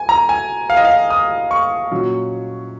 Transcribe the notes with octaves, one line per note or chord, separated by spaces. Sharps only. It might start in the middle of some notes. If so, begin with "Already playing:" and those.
Already playing: G#5
A#5
G#5
F5
D#5
F5
D#6
C#6
A#2 F#3 C#4